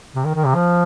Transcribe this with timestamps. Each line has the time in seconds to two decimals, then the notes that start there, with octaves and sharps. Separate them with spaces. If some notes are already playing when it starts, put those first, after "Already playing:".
0.15 C3
0.25 D#3
0.35 D#3
0.45 C3
0.55 F3